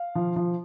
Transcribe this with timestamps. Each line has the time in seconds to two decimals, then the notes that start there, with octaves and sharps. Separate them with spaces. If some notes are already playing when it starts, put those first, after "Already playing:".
Already playing: F5
0.15 F3
0.36 F3